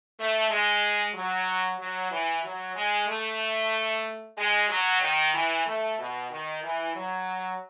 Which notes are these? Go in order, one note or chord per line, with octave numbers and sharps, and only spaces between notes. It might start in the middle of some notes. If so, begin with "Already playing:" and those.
A3
G#3
F#3
F#3
E3
F#3
G#3
A3
G#3
F#3
D#3
E3
A3
B2
D#3
E3
F#3